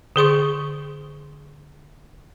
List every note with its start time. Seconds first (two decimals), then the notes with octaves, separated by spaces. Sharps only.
0.16 D3 G#4 C6 C#6